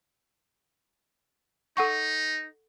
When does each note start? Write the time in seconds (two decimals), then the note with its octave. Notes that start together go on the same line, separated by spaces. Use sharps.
1.77 D#4 A4 F#5 C#6